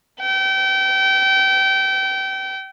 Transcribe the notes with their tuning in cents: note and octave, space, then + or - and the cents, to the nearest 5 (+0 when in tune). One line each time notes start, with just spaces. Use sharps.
G5 -30